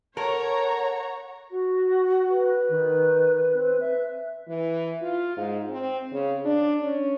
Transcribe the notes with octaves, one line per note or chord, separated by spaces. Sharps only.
A4 A#4 C#5 F#5 A#5
F#4
B4
D#3
C4
E5
E3
F4
G#2
C4
C#3
D4
C#4